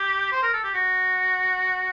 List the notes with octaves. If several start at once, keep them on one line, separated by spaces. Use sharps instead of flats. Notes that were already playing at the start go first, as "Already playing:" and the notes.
Already playing: G4
C5
A#4
A4
G4
F#4